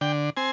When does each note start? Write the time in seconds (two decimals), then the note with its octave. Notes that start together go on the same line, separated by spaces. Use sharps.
0.01 D3 G5
0.37 C4 G#5